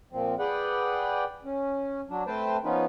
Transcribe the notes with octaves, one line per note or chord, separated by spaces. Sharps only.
A#2 F3 C4
G#4 B4 D5 F#5 G5
C#4
F#3 D4
A3 C4 B4 C5 G5 A5
F3 B3 C#4 D#4 F4 B4